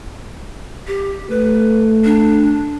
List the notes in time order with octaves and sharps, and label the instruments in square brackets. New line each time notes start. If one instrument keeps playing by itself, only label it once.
[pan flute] G4
[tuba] A3 [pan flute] B4
[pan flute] D4